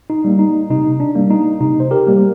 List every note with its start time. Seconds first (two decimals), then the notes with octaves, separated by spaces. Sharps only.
0.10 D#4
0.25 G3 A#3
0.39 D#4
0.70 C3 D#4
1.00 D4
1.15 G3 A#3
1.30 D#4
1.60 C3 D#4
1.80 C5
1.91 G4 A#4
2.07 G3 A#3